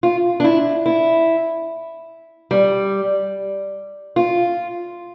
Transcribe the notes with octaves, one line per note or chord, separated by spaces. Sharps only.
F4
D4
E4
E4
G3
F4